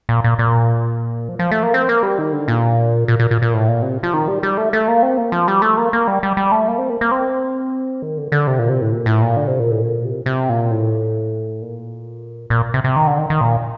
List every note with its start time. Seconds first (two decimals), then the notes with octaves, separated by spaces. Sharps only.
0.09 A#2
0.24 A#2
0.39 A#2
1.29 F3
1.39 F3
1.51 A3
1.63 A#3
1.74 C4
1.89 A#3
2.03 G3
2.19 D#3
2.33 D3
2.48 A#2
3.08 A#2
3.19 A#2
3.31 A#2
3.42 A#2
3.53 A2
3.68 A#2
3.82 C3
4.03 F3
4.13 D#3
4.28 G3
4.43 G3
4.58 A3
4.73 A3
4.88 A#3
5.03 C4
5.17 A#3
5.32 F3
5.48 G3
5.62 A3
5.77 A#3
5.93 A#3
6.08 G3
6.23 G3
6.37 G3
6.52 A3
6.68 A#3
6.78 C4
6.90 A#3
7.01 A#3
7.12 C4
8.02 D#3
8.17 D3
8.32 D3
8.47 C3
8.59 A#2
8.69 C3
8.81 A2
8.92 A#2
9.06 A2
9.22 A#2
9.36 D3
9.48 C3
9.59 A#2
9.71 A2
9.82 A#2
10.05 C3
10.26 C3
10.49 A#2
10.71 A2
11.62 A#2
12.50 A#2
12.74 C3
12.84 C3
12.96 D#3
13.07 D3
13.18 D#3
13.30 D#3
13.41 A#2